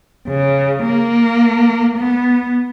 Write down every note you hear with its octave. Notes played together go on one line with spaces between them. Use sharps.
C#3
A#3
B3